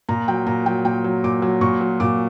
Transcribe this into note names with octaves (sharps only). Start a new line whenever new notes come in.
A#2 A#5
F#3 G5
A#2 A#5
F#3 G5
A#2 G5
F#3
A#2 D6
F#3
A#2 C#6
F#3
A#2 D6